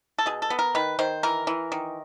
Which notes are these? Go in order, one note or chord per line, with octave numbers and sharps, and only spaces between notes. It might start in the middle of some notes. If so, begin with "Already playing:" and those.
A4
B2 G#4
A4
B3
A#4
D#3 B4
D#3 C5
E3 A#4
E3
D#3